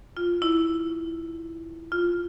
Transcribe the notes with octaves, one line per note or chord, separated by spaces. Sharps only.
F4
E4
F4